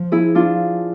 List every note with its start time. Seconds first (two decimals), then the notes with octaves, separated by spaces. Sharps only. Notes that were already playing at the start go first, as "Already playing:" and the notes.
Already playing: F3
0.12 E4 G#4
0.35 D4 F4